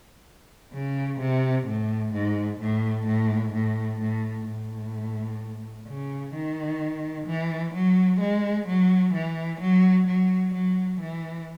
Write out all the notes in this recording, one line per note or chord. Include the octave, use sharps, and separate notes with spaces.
C#3
C3
A2
G#2
A2
A2
A2
A2
A2
C#3
D#3
E3
F#3
G#3
F#3
E3
F#3
F#3
F#3
E3